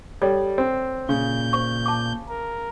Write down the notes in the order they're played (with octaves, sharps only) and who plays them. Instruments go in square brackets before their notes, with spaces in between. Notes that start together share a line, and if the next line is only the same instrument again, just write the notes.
[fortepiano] G3 [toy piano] A4 C#5 D5
[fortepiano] C4
[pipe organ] A#2 G6 [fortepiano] C#3
[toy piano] C5 C#6
A5 D6
[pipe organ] A#4